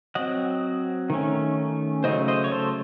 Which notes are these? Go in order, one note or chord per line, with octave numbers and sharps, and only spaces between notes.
F#3 C4 D#5 F#5
D#3 A3 C#4
C#3 F#3 A3 C5 D#5
C5 D#5
C#5
A4 C5